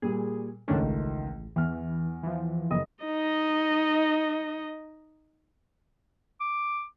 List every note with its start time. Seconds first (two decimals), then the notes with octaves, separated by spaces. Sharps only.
0.02 A#2 G3 G#4
0.68 C#2 D#3 A3 C#4 D4
0.82 A1
1.56 E2 E3 F6
2.23 E3 F3
2.71 F#1 D#5 D#6
3.04 D#4 D#5
6.41 D6